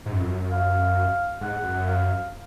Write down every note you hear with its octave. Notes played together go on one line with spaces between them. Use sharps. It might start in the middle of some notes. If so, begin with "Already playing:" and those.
G#2
F#2
F2
F#2
F5
G#2 F#5
F#2
F5